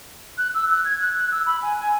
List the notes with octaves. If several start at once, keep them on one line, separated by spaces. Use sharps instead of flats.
F#6
E6
F#6
G#6
F#6
F#6
E6
B5
G#5
G#5